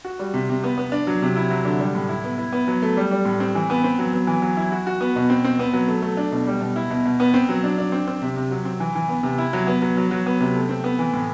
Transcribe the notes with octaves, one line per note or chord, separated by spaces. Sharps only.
F#4
G3
C3
C3
B3
B3
D4
F#3
C3
E4
F#3
D3
G3
A2
E4
B3
E4
B3
F#3
A3
G3
G3
A2
C4
E3
B3
C4
F#3
B3
E3
F#3
E4
F#4
F#4
B3
B2
C4
C4
B3
F#3
A3
A3
D4
B2
G3
B2
E4
B2
B2
B3
C4
F#3
D4
D4
C4
C4
C3
C3
F#3
C4
E3
E3
B3
C3
E4
F#3
B3
F#3
F#3
F#3
B3
C3
A3
C4
B3
E3
A2